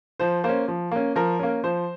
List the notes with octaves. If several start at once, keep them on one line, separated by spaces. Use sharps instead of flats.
F3 C5
A#3 C#4 C5
F3
A#3 C#4
F3 A#4
A#3 C#4
F3 C5